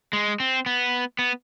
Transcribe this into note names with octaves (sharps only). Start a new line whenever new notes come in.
G#3
C4
B3
B3